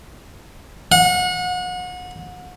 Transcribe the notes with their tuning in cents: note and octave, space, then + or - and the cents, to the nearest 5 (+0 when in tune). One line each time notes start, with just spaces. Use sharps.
F#5 -35